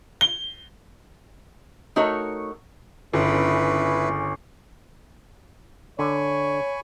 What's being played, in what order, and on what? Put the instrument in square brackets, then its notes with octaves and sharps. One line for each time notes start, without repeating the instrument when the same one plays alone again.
[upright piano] G7
[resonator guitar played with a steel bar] A3 D#4 F#4 A#4 C#5
[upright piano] G1 [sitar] C#3 [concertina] E4 B4
[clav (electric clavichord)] D3 [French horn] C#5 [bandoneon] G#5 B5 C#6